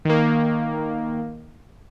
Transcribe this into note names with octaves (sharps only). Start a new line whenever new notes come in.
D#3 A#3